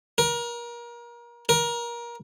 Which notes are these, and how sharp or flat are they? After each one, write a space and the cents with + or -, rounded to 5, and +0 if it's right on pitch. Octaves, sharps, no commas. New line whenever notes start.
A#4 +30
A#4 +25